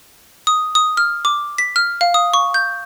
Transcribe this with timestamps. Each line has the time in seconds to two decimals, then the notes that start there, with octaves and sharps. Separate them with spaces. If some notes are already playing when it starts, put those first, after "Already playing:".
0.47 D#6
0.75 D#6
0.97 F6
1.25 D6
1.58 B6
1.76 F6
2.01 F5
2.14 D#6
2.34 C#6
2.54 G6